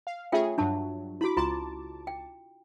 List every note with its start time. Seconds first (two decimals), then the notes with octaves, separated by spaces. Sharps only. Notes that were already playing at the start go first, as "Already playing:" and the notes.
0.07 F5
0.32 A3 C#4 F4 G#4 E5 G5
0.58 G2 F#3 D4 A5
1.21 E4 F#4 B5 D6
1.37 C#2 F4 A5 A#5 C6 D6
2.07 G5